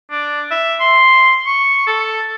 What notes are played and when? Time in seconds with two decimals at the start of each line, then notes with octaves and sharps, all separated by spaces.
0.11 D4
0.51 E5
0.80 C6
1.46 C#6
1.87 A4